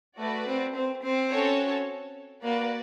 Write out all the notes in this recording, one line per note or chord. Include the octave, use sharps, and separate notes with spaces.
A3 F#4 B4 D5
C4
C4
C4
C#4 F#4 A4 C#5
A#3 F#4 B4 D5